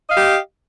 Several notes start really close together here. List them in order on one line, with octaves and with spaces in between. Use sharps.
D#5 F5 G4